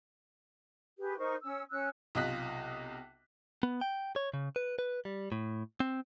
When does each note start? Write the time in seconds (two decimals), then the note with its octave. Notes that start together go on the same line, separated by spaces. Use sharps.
0.99 G4 G#4 B4
1.18 D#4 A#4 C5 C#6
1.43 C#4 E6
1.70 C#4 E6 F#6
2.15 B1 C3 F4 D#5 F#6 B6
3.63 B3
3.81 G5
4.16 C#5
4.34 C#3
4.56 B4
4.79 B4
5.05 G3
5.32 A2
5.80 C4